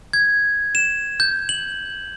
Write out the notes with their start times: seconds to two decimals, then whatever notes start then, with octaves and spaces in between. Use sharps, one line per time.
0.13 G#6
0.75 E7
1.20 G6
1.49 F#7